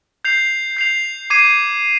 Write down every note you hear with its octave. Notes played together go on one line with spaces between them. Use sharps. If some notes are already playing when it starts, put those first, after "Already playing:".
G6 C7 F7
G6 C7 F7
D6 G#6 C7 D#7